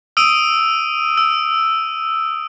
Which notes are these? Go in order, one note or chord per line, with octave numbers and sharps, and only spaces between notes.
D#6 E6 D7 D#7
E6